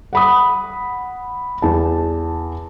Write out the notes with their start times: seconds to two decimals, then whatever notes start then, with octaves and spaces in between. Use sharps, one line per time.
0.13 F#5 B5 D#6
1.62 E2 A5